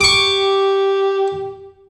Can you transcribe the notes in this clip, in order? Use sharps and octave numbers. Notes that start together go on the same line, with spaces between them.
G4 C#6 D6